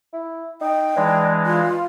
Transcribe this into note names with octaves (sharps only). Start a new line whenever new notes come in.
E4
D#4 G5
E3 G#3 D4 D5
F4